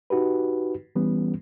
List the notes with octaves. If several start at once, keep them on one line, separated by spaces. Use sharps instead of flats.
D#4 F#4 G4 B4
E3 G3 B3 C#4